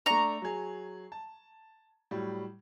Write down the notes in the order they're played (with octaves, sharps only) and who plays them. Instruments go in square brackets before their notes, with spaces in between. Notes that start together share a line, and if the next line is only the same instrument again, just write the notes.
[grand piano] A3 D4 [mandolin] A#5 C#6
[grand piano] F#3 G#4
A5
A2 F#3 G3